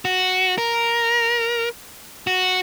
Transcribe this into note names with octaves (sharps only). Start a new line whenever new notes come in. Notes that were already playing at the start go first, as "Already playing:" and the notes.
F#4
A#4
F#4